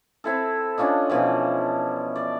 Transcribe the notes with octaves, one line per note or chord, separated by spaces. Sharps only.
C4 E4 A4
C#4 D4 F4 D#5
B2 E3 F3
D5